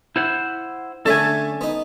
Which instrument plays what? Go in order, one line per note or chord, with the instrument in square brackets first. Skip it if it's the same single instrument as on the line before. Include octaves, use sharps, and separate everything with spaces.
[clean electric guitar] E4 C5 F#5
[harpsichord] D3 A3 C#4 [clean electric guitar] A4 E5 G#5
[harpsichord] B3 D#4